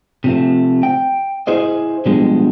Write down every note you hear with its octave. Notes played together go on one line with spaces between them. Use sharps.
C3 F3 A3
G5
E4 G#4 C5 D#5
B2 F3 G3 G#3 D4